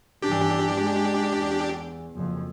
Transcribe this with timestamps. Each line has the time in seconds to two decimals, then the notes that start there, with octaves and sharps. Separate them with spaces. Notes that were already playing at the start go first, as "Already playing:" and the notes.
0.22 G1 E3 D4 G4
0.75 G#3
1.33 E2
2.15 F#1 F2